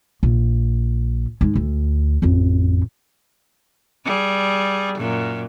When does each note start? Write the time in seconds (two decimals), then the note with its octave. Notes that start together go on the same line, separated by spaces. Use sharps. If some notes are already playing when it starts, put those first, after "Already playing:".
0.23 A#1
1.41 G#2 G#3
1.56 D2
2.22 A1 F2
4.05 G3 G#4
4.97 F#2 A#2 F#3